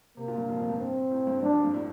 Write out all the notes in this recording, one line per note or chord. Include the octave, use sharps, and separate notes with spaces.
C3 A#3
A#2
G2
F2
F2
G2
C4
A2
G2
G2 D4
F2
G2
A2